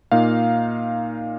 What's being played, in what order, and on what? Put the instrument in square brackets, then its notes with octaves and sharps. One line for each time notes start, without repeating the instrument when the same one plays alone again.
[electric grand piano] A#2 A#3 D#4 F5